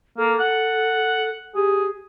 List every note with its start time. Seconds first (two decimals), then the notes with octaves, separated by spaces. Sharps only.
0.18 A#3 A4
0.40 F#5
1.55 G4 G#4